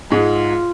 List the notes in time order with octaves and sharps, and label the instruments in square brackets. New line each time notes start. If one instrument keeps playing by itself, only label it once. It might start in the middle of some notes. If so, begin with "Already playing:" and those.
[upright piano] G#2 G#3 [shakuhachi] F4